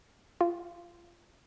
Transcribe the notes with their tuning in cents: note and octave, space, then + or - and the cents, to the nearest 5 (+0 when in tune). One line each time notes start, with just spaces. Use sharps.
F4 -15